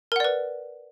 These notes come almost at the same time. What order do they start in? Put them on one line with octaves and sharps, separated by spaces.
A#4 F#5 D5 B4